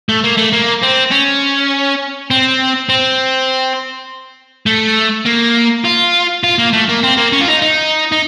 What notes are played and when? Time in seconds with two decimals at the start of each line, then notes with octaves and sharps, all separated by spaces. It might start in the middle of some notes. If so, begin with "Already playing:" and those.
0.09 A3
0.24 A#3
0.37 A3
0.52 A#3
0.83 C4
1.11 C#4
2.30 C4
2.89 C4
4.66 A3
5.26 A#3
5.85 F4
6.44 F4
6.58 A#3
6.73 A3
6.89 A#3
7.03 C4
7.17 A#3
7.33 C#4
7.41 F4
7.48 D#4
7.62 D#4
8.12 D#4